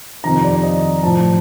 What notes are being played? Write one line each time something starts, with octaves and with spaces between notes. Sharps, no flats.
F2 C3 D#3 A#5
D5
D#5
A2 F3 A5